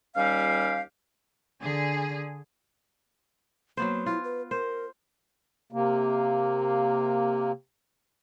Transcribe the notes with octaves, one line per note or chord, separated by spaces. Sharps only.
D#2 G3 C#4 G4 F5
D3 G#4
F#3 A#3 B3 C5
E4 F4
B4
A#4 C5
C3 A#3